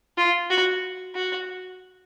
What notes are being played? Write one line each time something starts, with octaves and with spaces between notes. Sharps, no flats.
F4
F#4
F#4